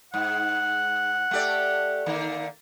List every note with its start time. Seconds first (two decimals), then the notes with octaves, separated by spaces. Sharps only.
0.14 G#2 F#5
1.31 A3 G4 D5
2.06 D3 D#3 A#3